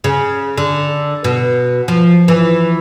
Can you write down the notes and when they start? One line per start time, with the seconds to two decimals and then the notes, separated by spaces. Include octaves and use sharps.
0.04 C#3
0.58 D3
1.24 B2
1.88 F3
2.28 E3